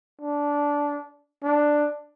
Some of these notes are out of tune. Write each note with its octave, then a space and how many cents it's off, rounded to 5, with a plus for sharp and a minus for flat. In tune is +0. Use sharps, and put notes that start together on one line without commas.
D4 -15
D4 +5